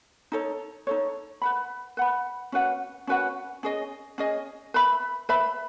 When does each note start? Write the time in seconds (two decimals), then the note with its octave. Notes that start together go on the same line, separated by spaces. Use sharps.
0.32 D#4 A4 C#5
0.87 D#4 A4 C#5
1.42 B4 F#5 B5
1.97 B4 F#5 B5
2.52 C#4 F#4 B4 F#5
3.07 C#4 F#4 B4 F#5
3.63 C#4 G#4 D#5
4.18 C#4 G#4 D#5
4.74 B4 E5 B5
5.29 B4 E5 B5